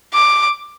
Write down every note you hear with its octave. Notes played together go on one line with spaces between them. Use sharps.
D6